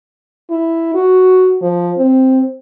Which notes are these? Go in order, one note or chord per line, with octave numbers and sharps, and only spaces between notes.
E4
F#4
F3
C4